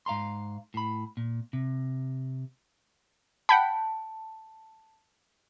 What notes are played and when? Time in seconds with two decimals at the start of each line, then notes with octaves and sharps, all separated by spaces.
0.06 G#2 F5 A#5 C6
0.74 A2 B5
1.17 A#2
1.53 C3
3.49 F#5 G5 A5 B5